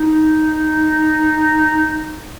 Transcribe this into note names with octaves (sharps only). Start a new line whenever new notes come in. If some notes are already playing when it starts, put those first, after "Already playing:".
Already playing: D#4